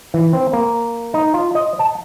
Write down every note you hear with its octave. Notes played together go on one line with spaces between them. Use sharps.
E3
C4
A#3
D#4
F4
D#5
A5